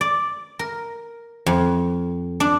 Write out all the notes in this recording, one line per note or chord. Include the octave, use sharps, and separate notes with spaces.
D5
A#4
F2
D4